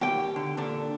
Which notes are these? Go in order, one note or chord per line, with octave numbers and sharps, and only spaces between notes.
D#2 B2 G4 G5
D3
A#2 D3 D4